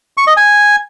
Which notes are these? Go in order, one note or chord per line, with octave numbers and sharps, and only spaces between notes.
C#6
D#5
G#5